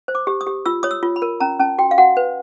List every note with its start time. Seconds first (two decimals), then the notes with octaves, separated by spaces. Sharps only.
0.08 C5
0.15 D6
0.27 G4
0.41 D#6
0.47 G4
0.66 F4 E6
0.83 C#5 D#6
0.91 E6
1.03 F4
1.16 B5
1.22 A#4
1.40 C#4 A#5
1.60 C#4 A5
1.79 F#4 G5
1.91 F5
1.98 F#4 F#5
2.17 B4